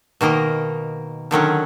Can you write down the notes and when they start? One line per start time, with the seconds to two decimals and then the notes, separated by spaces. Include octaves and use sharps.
0.21 B2 D#3 A#3 D#5
1.31 D3 D#3 F#3 C#4